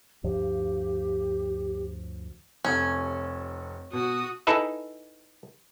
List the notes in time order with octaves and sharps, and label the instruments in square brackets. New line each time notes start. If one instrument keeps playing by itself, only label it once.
[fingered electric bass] D2 G2 F3 [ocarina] G4
[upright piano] F1 C3 A4 [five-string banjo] C#4
[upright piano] B2 [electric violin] F#4 D#6
[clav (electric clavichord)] D#4 E4 G#4 A4 B4 E5